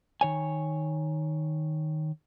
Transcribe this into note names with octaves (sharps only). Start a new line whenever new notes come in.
D#3 C#5 G#5